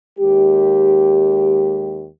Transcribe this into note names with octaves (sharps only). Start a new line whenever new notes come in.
D#2 G#3 G4